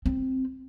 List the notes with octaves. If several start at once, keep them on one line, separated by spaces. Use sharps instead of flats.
C4